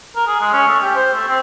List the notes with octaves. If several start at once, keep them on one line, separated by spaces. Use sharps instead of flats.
A#4
G#4
G#3
C#4
A3
G4
C5
A3
C4